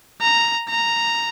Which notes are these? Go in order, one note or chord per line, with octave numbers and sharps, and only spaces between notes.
A#5
A#5